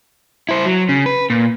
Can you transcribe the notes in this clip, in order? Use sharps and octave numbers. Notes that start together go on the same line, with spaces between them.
E4 C5
F#3
C#3
B4
A#2